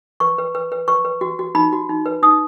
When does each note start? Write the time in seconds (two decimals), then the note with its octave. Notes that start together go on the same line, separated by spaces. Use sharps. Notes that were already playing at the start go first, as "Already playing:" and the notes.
0.20 B4 C#6
0.38 B4
0.55 B4
0.72 B4
0.88 B4 C#6
1.05 B4
1.21 F#4
1.39 F#4
1.55 D#4 B5
1.73 F#4
1.89 D#4
2.06 B4
2.23 D#4 D#6